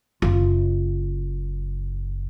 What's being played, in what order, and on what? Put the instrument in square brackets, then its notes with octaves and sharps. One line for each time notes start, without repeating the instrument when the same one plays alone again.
[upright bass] F#1 F4